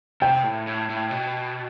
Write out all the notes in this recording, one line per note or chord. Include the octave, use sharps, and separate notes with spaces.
C3 G5
A2
A2
A2
B2